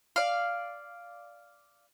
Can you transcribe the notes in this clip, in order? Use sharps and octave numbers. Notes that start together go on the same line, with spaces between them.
D5 F5